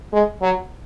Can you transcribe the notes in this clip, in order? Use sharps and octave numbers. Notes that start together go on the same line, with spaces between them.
G#3
F#3